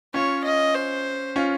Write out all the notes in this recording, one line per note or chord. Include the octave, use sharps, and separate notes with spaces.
C#4 F4 C#5
D#5
C5
C#4 F4